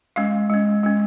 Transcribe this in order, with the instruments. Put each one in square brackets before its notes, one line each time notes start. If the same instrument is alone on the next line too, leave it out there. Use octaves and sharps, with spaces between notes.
[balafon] G#3 C#4 F5
G#3 C#4
G#3 C#4